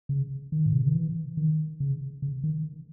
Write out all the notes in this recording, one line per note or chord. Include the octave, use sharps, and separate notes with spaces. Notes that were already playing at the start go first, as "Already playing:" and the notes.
C#3
D#3
A2
C3
C#3
D#3
E3
D#3
C#3
C#3
D#3